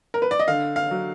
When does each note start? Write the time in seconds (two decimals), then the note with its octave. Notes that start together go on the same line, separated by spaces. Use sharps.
0.14 A#4
0.22 B4
0.31 D5
0.39 D#5
0.48 D3 F5
0.76 F5
0.91 F#3